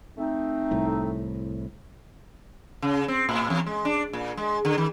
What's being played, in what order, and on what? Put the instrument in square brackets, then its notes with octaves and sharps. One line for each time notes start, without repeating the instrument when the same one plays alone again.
[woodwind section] A3 C4 D#4
[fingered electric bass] C2 A2
[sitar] C#3
C4
A2
E2
G#3
D4
A#2
G#3
D3
D#3